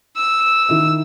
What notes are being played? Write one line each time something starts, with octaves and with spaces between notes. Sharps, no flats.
E6
D#3 E4 E5